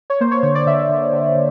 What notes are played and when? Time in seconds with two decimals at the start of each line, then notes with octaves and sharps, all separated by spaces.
0.10 C#5
0.21 A#3 C5
0.31 C#5
0.43 D3 C#5
0.55 D5
0.66 D3 E5
0.89 D3
1.12 D3
1.35 D3